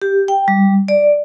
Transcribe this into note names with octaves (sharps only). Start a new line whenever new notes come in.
G4
G5
G3
D5